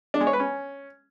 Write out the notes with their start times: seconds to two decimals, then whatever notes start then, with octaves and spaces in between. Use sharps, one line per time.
0.14 D4
0.20 G#3
0.27 C#5
0.33 B4
0.40 C#4